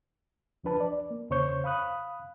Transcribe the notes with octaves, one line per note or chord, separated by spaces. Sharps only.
D2 F3 D4 B4 A5
D5
A#3
E2 C#3 C5 C#5 C#6 G6
F5 B5 D#6 F#6